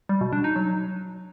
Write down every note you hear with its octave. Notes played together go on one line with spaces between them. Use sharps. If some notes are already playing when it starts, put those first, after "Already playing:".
G3
B2
D4
D#4
F#3